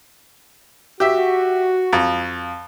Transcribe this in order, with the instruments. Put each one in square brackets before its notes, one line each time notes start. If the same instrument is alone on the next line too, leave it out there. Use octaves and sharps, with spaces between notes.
[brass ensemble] F#4 [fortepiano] G4 E5
[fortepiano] F2